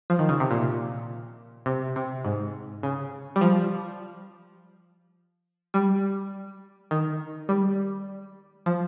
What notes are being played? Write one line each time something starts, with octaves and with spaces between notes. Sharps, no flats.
F3
D#3
C#3
C3
A#2
C3
C3
G#2
C#3
G3
F3
G3
D#3
G3
F3